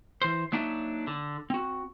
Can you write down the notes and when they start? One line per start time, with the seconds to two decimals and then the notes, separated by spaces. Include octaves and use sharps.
0.22 E3 C5
0.52 F#3 A#3 D4 D#4 E5
1.07 D3
1.50 C4 F#4